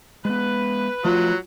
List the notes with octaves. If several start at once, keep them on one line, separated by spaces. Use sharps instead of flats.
G#3 B3 B4
F3 F#3 A3 F4